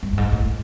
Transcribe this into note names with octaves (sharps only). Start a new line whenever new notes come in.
G2
G2
G#2
A2